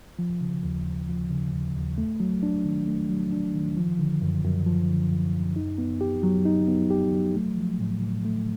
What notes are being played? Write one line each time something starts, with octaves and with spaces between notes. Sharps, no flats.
F3
C#3
D#2
D#2
F3
C#3
D#2
D#2
A3
F#3
D4
D#3
A3
F#3
D4
D#3
F3
D3
F#2
F#2
F3
D3
F#2
F#2
D#4
B3
G4
F#3
D#4
B3
G4
F#3
A3
F3
A2
A2
A3